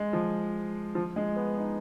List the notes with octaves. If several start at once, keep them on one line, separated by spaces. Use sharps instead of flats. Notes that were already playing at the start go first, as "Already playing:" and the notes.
Already playing: G#3
F3
F3
G#3
B3
D#4